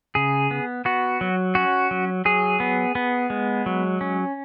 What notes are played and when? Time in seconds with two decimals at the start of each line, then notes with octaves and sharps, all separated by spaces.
0.15 C#3 G#4
0.51 B3
0.85 B3 F#4
1.21 F#3
1.55 C#4 F#4
1.91 F#3
2.25 F#3 G#4
2.60 B3
2.95 B3
3.30 G#3
3.66 F#3
4.01 C#4